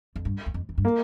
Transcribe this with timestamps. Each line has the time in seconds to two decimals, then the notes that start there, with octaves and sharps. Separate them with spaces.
0.16 F2
0.25 G2
0.46 E2
0.54 F2
0.69 E2
0.78 G2
0.85 A#3